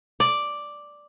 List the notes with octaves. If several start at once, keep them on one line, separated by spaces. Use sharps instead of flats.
D5